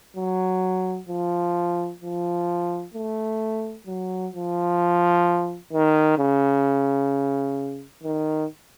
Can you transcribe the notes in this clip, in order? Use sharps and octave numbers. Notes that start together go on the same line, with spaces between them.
F#3
F3
F3
A3
F#3
F3
D#3
C#3
D#3